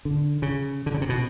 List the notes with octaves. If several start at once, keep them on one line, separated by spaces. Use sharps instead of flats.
D3
C#3
D3
C#3
C3
B2